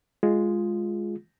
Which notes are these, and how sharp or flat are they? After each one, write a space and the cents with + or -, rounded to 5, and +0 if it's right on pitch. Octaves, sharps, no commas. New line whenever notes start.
G#3 +0 F4 +0 G#4 +0